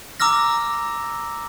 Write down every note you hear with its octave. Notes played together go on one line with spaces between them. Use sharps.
A#5 D6 E6 F6 A#6